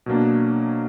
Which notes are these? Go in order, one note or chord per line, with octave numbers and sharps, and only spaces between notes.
B2 F#3 A#3 D4